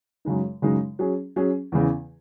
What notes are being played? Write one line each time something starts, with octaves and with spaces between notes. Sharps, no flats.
F#2 C#3 G#3 D#4
F#2 C#3 G#3 D#4
F#3 C#4 G#4
F#3 C#4 G#4
E2 C#3 E3